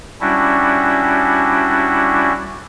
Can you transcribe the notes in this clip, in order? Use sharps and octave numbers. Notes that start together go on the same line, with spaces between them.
G3 C#4 D4 E4 F#4